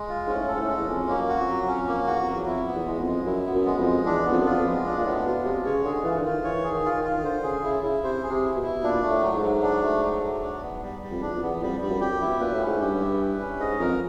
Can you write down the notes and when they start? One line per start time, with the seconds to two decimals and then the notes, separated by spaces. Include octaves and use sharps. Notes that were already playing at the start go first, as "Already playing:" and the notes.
Already playing: G#3
0.09 F4
0.27 G#2 C#4
0.35 A2
0.47 A4
0.55 G#2
0.61 A2
0.67 G#3
0.78 E2
0.88 F2 C#4
1.08 F2 A#3
1.14 F#2
1.28 F#4
1.40 F2
1.47 F#3
1.68 F2 C#4
1.87 A#3
2.07 E2 F#4
2.20 F2
2.28 F#3
2.33 E2
2.46 F2 E4
2.67 B3
2.74 E2
2.86 E2 G#3
3.00 F2
3.07 G#3
3.26 F#2 E4
3.46 B3
3.53 F#2
3.66 G#3
3.80 F2
3.86 G#3
4.06 E2 D4
4.26 B3
4.32 F2
4.40 F#2
4.45 F2 F4
4.59 F2
4.66 G#3
4.86 D4
4.97 A#2
5.05 A2 B3
5.25 B2 F4
5.44 C3 G#3
5.65 C#3 C#5
5.84 D3 G#4
6.04 E3 F4
6.18 D3
6.24 D#3 F4
6.44 E3 C#5
6.64 G#4
6.71 D#3
6.85 F4
6.97 D#3
7.04 F4
7.17 D#3
7.23 D3 C5
7.43 C#3 G#4
7.63 C#3 E4
7.83 C#3 E4
8.03 C3 C5
8.23 G#4
8.30 C3
8.44 E4
8.56 B2
8.62 E4
8.83 A#2 D4
9.02 A3
9.10 A2
9.22 F#3
9.36 G#2
9.42 F#3
9.62 D4
9.83 A3
10.02 F#3
10.23 F#3
10.43 D4
10.61 B3
10.82 G3
11.02 G3
11.11 F2
11.21 E2 D4
11.34 F2
11.42 E2 B3
11.62 F2 G3
11.81 G2 G3
11.90 F#2
12.01 F2 G4
12.10 F#2
12.21 B2 E4
12.40 A#2 B4
12.53 A2
12.60 C#4
12.66 G#2
12.80 G2 G4
13.00 E4
13.21 B4
13.41 C#4
13.60 G#2 D#5
13.80 F2 A#4